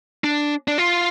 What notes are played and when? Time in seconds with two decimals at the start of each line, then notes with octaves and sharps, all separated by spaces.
0.24 D4
0.68 D4
0.78 F4